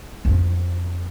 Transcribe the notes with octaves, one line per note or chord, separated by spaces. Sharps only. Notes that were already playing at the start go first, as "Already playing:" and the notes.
F2 F3